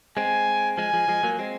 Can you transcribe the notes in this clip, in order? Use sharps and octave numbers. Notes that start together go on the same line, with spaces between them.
G#3 C4 G#5
F3 G#3 G#5
F3 G#3
F3 G#3
F#3 A#3
G#3 C4